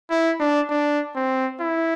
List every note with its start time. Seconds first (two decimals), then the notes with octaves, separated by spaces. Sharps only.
0.10 E4
0.40 D4
0.70 D4
1.16 C4
1.60 E4